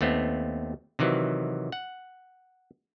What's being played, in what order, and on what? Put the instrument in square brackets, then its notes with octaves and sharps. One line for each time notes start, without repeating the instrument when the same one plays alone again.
[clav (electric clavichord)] D#2 A3 B3 C4
C3 D#3 E3 F#3
F#5